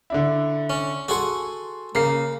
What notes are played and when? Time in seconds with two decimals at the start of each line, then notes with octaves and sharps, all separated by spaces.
0.10 D3 D4 E4
0.70 C#4
1.08 F#4 G#4 A4 F#5 C6
1.95 C#3 A#3 C7